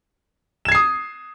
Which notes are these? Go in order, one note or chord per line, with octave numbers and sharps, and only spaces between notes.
D#6 G#6 C7 E7